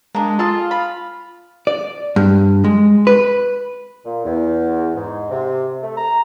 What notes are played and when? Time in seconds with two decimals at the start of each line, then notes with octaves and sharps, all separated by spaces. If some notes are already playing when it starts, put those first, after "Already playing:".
0.15 G#3 A#3 D4
0.39 F4 G#4 A4 A5
0.71 B5
1.67 D5
2.16 G2
2.64 G#3
3.07 B4
4.05 A#2
4.24 E2
4.95 G#2
5.30 C3
5.82 A3
5.97 A#5